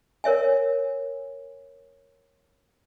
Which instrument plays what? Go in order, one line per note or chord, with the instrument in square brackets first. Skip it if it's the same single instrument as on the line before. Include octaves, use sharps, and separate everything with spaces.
[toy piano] A#4 C#5 E5 G#5